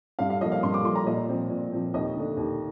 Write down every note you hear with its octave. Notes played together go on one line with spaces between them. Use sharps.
G2 F5
F5
F3 A#3 D#5
F5
G2 C6
D6
F3 A#3 C6
A#5
A#2 D#5
F3 C4
A#2
F3 C4
D#2 D#5
D3 A3 D4
D#2